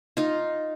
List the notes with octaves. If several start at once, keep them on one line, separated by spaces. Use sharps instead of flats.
D#4 F4